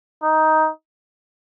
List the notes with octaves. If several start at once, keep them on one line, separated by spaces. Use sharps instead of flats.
D#4